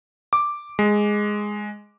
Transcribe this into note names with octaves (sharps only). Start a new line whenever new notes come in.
D6
G#3